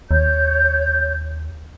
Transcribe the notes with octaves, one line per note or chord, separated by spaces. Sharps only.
D#2 C#5 G6